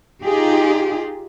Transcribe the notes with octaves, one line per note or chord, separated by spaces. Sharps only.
D#4 F4 G4 G#4